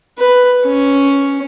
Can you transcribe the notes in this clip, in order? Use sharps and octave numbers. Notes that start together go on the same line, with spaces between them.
B4
C#4